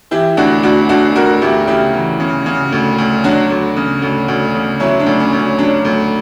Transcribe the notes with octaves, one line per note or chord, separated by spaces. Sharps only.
E3 E4 G4
D2 D4 F#4
D2 D4 F#4
D2 D4 F#4
D2 F#4 A#4
D2 E4 G4
C#3 E4 G4
E3
C#3
C#3
D2
D2
F#3 D4 F#4
D2
C#3
D2
D2
C#3
F#3 C#4 E4
D4
D2
C#4
D2
C#4
F#3 D4
D2